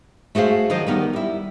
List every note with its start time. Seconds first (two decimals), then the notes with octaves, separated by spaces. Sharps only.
0.35 A3 F#4 G#4 C5 F5
0.70 D#3 F3 F#3 C5 D#5
0.87 D#3 G3 B3 D#4 A#4
1.13 G3 E4